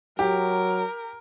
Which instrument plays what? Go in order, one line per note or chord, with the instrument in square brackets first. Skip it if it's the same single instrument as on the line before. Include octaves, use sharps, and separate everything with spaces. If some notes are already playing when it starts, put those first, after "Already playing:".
[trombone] F#3 [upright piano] G4 [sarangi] A#4